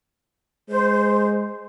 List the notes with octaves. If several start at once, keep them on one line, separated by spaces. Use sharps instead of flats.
G#3 C5